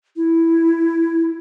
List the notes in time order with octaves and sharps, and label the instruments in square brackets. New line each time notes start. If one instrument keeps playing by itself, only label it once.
[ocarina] E4